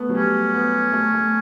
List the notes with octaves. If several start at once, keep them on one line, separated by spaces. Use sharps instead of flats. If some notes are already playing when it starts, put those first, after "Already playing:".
Already playing: A3 B3
F#3
G3 C#4
B3
A3
A3